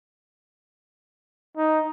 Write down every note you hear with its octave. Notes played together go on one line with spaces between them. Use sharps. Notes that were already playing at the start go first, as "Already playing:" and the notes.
D#4